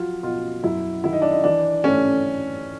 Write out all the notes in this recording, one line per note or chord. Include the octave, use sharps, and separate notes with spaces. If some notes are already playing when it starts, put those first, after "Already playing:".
Already playing: F3 F#3 F4
B2 F4
F#2 E4
D#3 E4
D#4
D4
D#4
E3 D4
A3 C#4